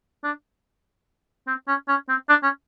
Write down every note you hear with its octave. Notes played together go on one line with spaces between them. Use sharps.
D4
C4
C#4
C#4
C4
D4
C#4